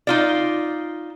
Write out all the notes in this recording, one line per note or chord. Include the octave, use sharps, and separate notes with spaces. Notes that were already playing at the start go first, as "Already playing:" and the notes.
D#4 F4 D5